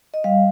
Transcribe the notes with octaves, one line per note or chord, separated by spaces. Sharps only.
D#5
G3 F5